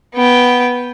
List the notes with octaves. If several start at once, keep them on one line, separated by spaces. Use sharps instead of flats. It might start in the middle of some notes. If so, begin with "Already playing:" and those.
B3 G5